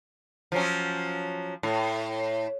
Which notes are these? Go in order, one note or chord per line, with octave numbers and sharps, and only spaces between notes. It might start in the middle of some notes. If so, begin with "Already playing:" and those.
F3 F#3 C#4
A2